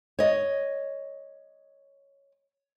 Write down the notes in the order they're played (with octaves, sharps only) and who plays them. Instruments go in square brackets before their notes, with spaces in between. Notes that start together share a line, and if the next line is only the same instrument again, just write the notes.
[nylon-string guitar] C#5 D#5